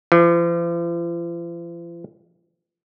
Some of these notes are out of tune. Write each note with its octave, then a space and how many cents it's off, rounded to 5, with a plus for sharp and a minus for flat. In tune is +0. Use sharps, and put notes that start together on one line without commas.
F3 -45